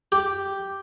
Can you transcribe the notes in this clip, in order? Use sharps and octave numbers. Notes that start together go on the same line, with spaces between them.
G4